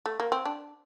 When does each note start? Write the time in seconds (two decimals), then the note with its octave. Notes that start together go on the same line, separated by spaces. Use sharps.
0.06 A3
0.20 A#3
0.32 C4
0.45 D4